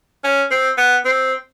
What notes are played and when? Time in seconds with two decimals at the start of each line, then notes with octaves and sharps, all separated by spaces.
0.24 C#4
0.51 C4
0.78 B3
1.05 C4